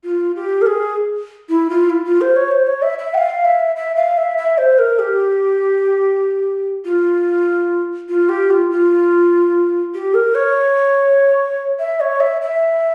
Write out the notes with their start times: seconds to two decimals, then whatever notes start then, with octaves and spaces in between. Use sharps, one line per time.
0.04 F4
0.36 G4
0.61 A#4
0.66 G#4
1.49 E4
1.70 F4
1.90 E4
2.05 F4
2.21 C5
2.36 C#5
2.51 C5
2.67 C#5
2.82 E5
2.98 E5
3.14 G5
3.18 F5
3.45 E5
3.76 E5
3.96 F5
4.17 E5
4.38 E5
4.58 C5
4.79 A#4
4.99 G4
6.85 F4
8.09 F4
8.29 G4
8.50 F4
8.71 F4
9.94 G4
10.14 A#4
10.35 C#5
11.79 E5
12.00 C#5
12.20 E5
12.41 E5